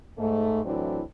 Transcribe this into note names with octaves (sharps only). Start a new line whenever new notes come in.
G#2 A3
A2 E3 F#3 C4 D4 E4